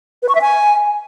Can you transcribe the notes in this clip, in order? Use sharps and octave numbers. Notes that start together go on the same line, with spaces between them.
B4
C#6
E5
G#5